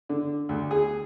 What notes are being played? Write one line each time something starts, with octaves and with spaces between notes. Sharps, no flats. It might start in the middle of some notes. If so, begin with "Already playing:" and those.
D3
D2
G#4